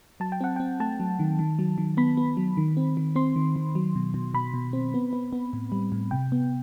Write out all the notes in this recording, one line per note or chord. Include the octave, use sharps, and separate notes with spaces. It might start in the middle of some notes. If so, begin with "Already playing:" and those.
F#3 A5
G5
C4 F#5
C4 G5
A3 A5
F#3
D#3
D#3
F#3
D#3
B3 B5
B3
F#3
D#3
C4
D#3
C4 C6
D#3
D#3
F#3
B2
B2
B2 B5
B2
C4
B3
B3
B3
A2
G3
A2
C3 G5
B3